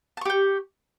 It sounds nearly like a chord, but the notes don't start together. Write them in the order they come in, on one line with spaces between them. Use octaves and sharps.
A5 C#6 G4 G5